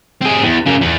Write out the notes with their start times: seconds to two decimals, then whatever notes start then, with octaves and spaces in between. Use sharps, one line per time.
0.22 C4 G#4
0.44 E2
0.66 C#3 A#3
0.82 E2